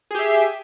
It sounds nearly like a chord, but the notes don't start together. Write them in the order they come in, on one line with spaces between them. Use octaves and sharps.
G#4 G4 E5